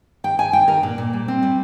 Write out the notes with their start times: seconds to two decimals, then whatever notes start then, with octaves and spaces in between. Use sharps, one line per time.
0.24 D#3 G5
0.38 D#3 G#5
0.53 D#3 G5
0.68 D#3 A#4
0.83 A#2 D4
0.98 A#2
1.13 G3
1.28 C4
1.43 G3